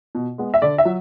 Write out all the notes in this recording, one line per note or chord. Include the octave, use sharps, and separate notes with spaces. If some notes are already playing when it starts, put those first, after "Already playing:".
B2
G#3 B3
E5
D3 D5
E5
F#3